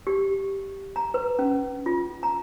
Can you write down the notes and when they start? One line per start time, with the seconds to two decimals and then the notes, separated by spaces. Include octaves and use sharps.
0.07 G4
0.96 A#5
1.14 B4
1.39 C#4
1.86 F4
2.23 A#5